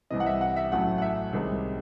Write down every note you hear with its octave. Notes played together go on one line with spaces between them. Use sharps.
C2 C3 E3 D#5
F#5
E5
F#5
E5
A1 A2 F#3 A3 F#5
F#5
E5
C2 C3 D#3 G#3